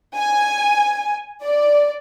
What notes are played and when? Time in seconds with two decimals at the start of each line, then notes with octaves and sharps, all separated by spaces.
0.16 G#5
1.42 D5